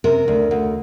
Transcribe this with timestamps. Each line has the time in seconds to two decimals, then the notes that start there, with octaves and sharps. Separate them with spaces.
0.04 C3 A#4
0.28 D2
0.51 D2